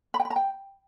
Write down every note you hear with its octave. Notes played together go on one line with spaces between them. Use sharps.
B5
G5
B5
A#5
G5